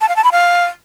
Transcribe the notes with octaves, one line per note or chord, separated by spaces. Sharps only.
A5
F5
A5
B5
F5